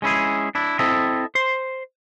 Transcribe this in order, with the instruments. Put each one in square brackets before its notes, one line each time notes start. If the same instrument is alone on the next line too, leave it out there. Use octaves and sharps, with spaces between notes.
[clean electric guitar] G#3 C#4 E4 G#4
D4 E4
C4 E4 A4 D#5 E5
C5 C6